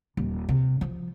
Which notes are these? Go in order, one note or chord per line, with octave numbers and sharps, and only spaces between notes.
D#1
C3
F3